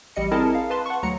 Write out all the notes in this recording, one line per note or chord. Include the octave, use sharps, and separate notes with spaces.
A1 G3 D#5 C#7
C4 E4 G#4 A#4 D#5 A5
F5
B4 A5 C6
F#5 C#6
D2 F#3 A#5 C#7